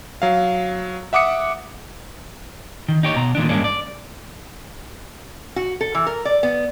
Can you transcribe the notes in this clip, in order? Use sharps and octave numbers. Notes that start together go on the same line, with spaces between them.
F#3 F5
E5 F#5 D6 D#6 C#7
D#3
D#4 G4 C#5
B2 A#5
A#2 D#3 D4
G2 G#3 A#3 C#4 D4
D5
F#4
A4
E3
A#4
D5
B3